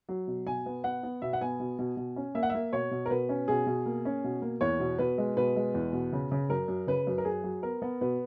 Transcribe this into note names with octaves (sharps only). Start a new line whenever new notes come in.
F#3
B2
B2 G#5
B3
B3 F#5
B3
B2 E5
F#5
B3 G#5
B2
B2
B2
C#4
A#3 E5
F#5
A#3 E5
B2 C#5
B2
A#4
B2 B4
C#4
B2 G#4
B2
A#3
C#4
B2
A#3
E2 C#5
B2
B2 B4
G#3
B2 B4
G#3
E2
B2
C#3
C#3
F#2 A#4
F#2
C#3 B4
F#2
A#4
F#2 G#4
F#3
B3 A#4
B3
B2 B4